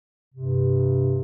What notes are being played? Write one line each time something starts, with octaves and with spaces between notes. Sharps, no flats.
G2 C3